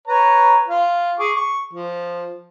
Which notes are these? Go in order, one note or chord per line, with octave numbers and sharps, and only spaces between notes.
B4 C#5 A#5
F4
G#4 C#6 D6
C#6
F3